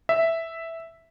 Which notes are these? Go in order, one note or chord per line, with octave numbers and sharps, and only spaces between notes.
E5